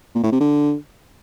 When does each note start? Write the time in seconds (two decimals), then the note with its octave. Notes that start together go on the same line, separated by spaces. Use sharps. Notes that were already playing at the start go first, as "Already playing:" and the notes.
0.15 A#2
0.23 A2
0.32 C3
0.40 D3